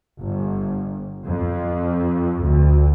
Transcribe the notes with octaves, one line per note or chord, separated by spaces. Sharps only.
G1
F2
D2